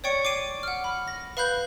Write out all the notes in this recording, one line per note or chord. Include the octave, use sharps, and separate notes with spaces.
C#5 D5 G5 C#6 C#7
D6 C7 D7 D#7
F#5 F6
B5
A#6
B4 F5 B5 F#6 G6